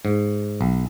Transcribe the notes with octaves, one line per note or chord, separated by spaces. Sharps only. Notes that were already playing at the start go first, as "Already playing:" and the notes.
G#2
B1